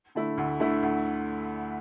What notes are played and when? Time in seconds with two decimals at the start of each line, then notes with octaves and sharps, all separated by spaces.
0.15 D3 A3 E4
0.37 D2
0.60 D3 A3 E4
0.82 D2